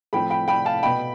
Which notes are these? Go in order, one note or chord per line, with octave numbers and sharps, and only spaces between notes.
A2 F3 C4 G5 B5
G5 B5
G5 B5
F5 A5
B2 B3 G5 B5